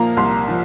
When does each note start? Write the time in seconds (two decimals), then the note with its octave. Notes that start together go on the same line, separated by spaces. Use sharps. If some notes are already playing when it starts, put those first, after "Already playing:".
Already playing: A#2 F3 A#3 F5 A#5
0.17 C2 C6
0.48 F3